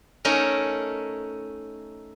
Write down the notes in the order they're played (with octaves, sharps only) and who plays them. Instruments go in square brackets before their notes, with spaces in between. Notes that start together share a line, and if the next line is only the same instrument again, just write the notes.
[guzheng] A3 C#4 D#4 A#4